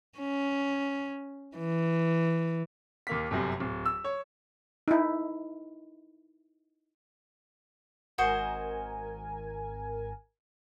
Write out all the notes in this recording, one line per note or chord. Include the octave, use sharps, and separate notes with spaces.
C#4
E3
D#2 A#3 B6
G1 F#2 C3
D1
E6
C#5
D#4 E4
G#1 F#4 A#4 C5 D#5 G#5